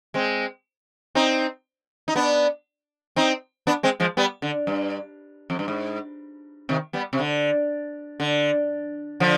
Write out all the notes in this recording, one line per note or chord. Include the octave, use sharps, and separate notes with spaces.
G#3 C4
C4 D#4
D#4
B3 D4
C4 D#4
B3 D4
G#3 C4
F3 G#3
G3 B3
D3
G2
F2
G2
G#2
C3 D#3
G3 B3
C3
D3
D3
D3 F3